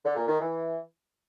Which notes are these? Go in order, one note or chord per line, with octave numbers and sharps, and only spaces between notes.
D3
A#2
D#3
E3